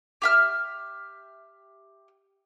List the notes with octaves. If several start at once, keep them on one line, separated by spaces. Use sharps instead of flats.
G4 E5 F6